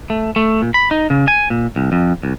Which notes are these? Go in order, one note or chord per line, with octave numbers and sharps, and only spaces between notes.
A3
A3
A#2
B5
D#4
C#3
G#5
A#2
C2
F2
C2